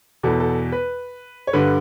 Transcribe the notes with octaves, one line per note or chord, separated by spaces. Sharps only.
E2 B2 A4
A4
B4
C#5
G2 D3 B4